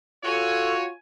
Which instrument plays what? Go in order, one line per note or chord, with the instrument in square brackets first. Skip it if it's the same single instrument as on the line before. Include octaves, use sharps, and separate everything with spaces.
[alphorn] F4 [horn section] F#4 C#5 [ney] A4 [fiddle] G#5